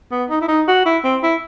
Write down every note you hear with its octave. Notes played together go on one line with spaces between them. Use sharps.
B3
D#4
E4
D#4
F#4
E4
C4
E4